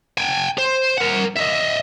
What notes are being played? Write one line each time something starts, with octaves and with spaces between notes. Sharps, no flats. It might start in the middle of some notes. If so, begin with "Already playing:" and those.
G5 G#5
C5
A#4 F#5
D#5 E5